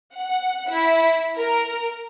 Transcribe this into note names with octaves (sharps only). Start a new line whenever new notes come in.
F#5
E4
A#4